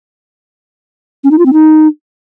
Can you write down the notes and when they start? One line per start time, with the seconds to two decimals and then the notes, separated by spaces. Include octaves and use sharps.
1.24 C#4
1.31 D#4
1.39 F4
1.46 C4
1.53 D#4